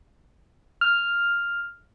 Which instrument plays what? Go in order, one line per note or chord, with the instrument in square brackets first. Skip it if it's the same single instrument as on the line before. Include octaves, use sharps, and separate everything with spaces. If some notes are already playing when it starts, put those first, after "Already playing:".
[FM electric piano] F6